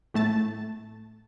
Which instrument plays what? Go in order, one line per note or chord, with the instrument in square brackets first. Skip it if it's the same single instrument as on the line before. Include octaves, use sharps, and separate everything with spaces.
[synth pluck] A2 A3 A5 A6